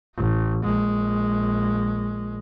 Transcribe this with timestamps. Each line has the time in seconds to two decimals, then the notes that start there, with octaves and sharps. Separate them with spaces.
0.16 A1
0.63 A#1 G#3